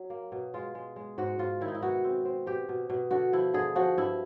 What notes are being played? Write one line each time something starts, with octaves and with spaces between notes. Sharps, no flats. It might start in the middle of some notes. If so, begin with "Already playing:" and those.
Already playing: F#3
A#3
B2
G#3 F4
G#3
G#3
G#2 F#4
G#2 F4
D#3 E4
D#4
E4
B2 F#4
C4
C4
B2 G4
B2
B2
D3 F#4
F3 E4
D3 G#4
F3 F#4
G2 E4